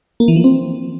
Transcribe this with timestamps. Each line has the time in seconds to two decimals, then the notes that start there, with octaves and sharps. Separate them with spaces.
0.20 A#3
0.28 E3
0.36 F3
0.44 C4